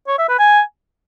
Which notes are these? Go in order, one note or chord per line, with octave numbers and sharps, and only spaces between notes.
C#5
E5
B4
G#5